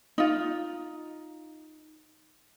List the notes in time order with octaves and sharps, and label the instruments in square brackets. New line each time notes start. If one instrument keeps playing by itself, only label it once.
[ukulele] D#4 F4